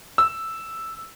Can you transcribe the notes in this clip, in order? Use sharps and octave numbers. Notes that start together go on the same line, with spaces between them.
E6